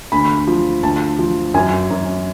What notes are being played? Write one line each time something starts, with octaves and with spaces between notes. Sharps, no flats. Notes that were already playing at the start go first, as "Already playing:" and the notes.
D2 B5
F3
D2 A5
F3
F#2 G#5
F#2